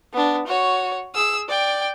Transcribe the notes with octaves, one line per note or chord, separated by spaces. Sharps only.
B3 D4
F#4 C#5
G#4 E6
D5 G5